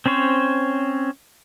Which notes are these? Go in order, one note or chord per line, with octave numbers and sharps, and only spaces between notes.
C4 C#4 C5 C#5